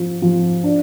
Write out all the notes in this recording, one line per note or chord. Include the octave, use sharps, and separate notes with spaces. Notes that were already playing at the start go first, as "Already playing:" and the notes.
Already playing: F3
F3
D4